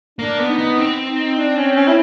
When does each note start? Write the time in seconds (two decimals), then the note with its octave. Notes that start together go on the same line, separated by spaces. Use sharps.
0.19 A#3 D4
0.39 B3
0.49 D#4
0.59 B3
0.78 C4
1.07 D#4
1.38 D4
1.57 C#4
1.76 C#4
1.87 E4